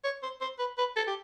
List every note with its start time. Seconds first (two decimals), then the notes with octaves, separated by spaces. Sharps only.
0.04 C#5
0.23 C5
0.41 C5
0.59 B4
0.78 B4
0.96 A4
1.07 G4